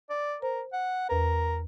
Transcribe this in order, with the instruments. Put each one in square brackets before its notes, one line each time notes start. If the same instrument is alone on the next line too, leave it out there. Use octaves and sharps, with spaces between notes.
[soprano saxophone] D5
[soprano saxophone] A#4 [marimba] C5
[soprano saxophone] F#5
[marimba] E2 B4 [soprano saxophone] A#4